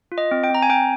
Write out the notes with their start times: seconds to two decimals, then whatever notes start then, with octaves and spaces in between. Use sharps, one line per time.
0.12 F4
0.18 D#5
0.31 C4
0.44 G5
0.50 C4 A#5
0.62 G#5
0.70 C4 G5